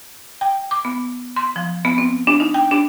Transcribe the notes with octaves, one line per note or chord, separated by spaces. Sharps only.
G5
D6
B3
C6
F3
B3
C4
D4
D#4
G5
D4